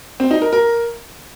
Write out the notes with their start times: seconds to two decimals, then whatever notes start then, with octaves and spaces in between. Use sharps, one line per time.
0.20 C4
0.31 D#4
0.42 A#4
0.53 A#4